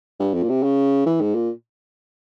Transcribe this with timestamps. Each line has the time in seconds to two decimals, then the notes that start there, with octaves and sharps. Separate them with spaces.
0.20 G2
0.34 F2
0.43 A#2
0.49 C3
0.63 C#3
1.06 E3
1.21 G#2
1.35 A#2